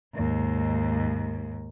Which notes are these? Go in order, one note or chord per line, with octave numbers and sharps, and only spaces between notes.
D#2 G#2